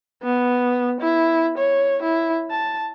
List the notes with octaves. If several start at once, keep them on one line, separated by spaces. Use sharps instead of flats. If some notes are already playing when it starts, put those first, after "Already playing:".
B3
E4
C#5
E4
A5